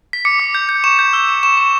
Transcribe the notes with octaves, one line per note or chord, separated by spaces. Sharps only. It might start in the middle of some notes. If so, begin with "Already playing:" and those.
B6
D6 C#7
D6
G6
G6
C#6 E7
G6
E6
C#6
C#6 E7
C#6